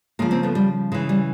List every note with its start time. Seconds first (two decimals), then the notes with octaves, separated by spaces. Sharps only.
0.19 C#3 F3 G#3 A#3
0.31 A#3 C4
0.43 A3 B3
0.55 G3
0.92 C#3 E3 G#3
1.09 G3